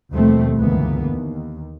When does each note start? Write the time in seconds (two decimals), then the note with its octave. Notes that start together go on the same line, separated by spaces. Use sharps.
0.13 D#2 B2 F3 G3 A3 C4
0.55 C#2 G2 D3 E3 A#3 B3
1.12 D#2